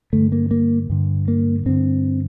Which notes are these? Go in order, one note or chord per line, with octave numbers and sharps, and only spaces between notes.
G2 D3 A3
A#3
A#3
G2 D3
A#3
G2 D3 C4